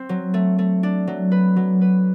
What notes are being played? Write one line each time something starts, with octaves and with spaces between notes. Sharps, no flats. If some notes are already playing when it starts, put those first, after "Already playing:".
Already playing: C4
F#3
A3
A3
D4
F#3
B4
F#3
B4